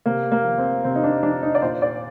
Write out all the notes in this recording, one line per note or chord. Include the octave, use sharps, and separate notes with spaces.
C3 A#3
A#3
F3
C4
C3 C4
D#4
D4
F3 D4
D#4
D5
A#2 C5
D5